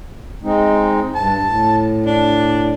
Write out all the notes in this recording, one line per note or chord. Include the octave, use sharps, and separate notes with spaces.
G#3 C4 D#4
G2 A5
A2
D4